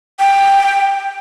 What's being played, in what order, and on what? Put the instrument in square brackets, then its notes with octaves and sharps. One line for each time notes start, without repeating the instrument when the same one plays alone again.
[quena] G5